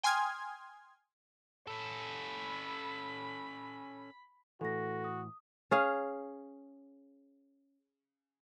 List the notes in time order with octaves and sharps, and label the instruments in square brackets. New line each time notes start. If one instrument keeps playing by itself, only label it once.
[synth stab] G5 G#5 C6 D#6 F6 G#6
[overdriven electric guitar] C#4 A4 [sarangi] B5
[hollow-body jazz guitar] A2 E3 [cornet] F#4 [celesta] A4 A#6
[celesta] D#6
[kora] C#4 G#4 F5